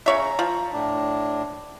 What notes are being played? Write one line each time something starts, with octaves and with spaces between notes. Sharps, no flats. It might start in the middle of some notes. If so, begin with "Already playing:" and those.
C#3 C#5 E5 A#5
F3
A2 D4